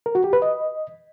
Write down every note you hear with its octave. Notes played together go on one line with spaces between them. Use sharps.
A#4
F#4
G4
B4
D#5